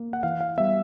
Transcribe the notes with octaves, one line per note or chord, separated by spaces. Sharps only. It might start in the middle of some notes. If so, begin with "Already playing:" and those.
Already playing: A#3
F#5
E3 F5
F5
G3 B3 E5